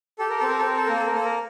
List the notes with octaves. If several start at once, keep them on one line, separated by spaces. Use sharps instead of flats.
G4 A4
A#4
C4 A4
A#4
A4
C4 A#4
A4
A#3 A#4
A4
A#4
A#3 A4
A#4